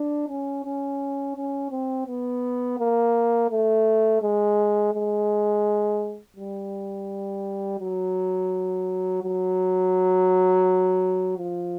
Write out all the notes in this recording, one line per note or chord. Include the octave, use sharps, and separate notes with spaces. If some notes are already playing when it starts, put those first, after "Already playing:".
Already playing: D4
C#4
C#4
C#4
C4
B3
A#3
A3
G#3
G#3
G3
F#3
F#3
F3